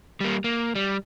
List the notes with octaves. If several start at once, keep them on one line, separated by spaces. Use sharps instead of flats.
G3 A#3
A#3
G3